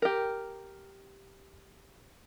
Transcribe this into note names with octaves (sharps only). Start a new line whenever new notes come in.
G4 A#4